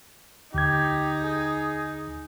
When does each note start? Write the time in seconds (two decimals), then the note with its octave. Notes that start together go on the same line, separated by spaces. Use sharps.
0.54 D2 D#4 G4 G#6
1.22 G#4